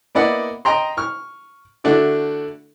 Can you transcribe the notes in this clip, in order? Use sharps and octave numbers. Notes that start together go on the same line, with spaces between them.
A#3 B3 E4 D5 D#5 F#5
D#5 G5 A#5 C6
C#6 F6
D3 A3 D4 E4 F#4